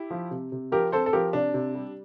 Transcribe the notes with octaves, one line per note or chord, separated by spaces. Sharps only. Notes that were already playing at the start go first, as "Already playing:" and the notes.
Already playing: E4 G4
F3
C3
C3
F3 G4 A#4
C4 A4 C5
A4
F3 G4 A#4
C3 D4
C3
G3